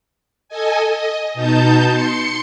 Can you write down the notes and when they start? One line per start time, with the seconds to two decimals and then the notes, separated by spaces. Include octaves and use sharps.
0.49 A4 D#5 G#5
0.88 D#5
1.34 B2 D#4 A5 G6
1.91 C6 C#7